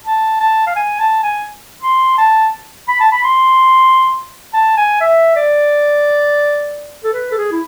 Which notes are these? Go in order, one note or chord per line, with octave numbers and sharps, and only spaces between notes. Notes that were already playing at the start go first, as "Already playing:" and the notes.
A5
A5
F5
G#5
A5
G#5
C6
A5
B5
A5
B5
C6
A5
G#5
E5
D5
A4
B4
A4
G#4
E4